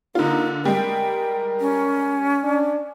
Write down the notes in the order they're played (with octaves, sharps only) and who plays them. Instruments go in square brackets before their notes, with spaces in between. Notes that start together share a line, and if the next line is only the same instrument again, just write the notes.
[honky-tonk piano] D3 F4 [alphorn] A#3 [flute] D#4
[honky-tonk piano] G3 G#3 [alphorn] A#4 [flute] G5
[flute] C#4
[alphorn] D4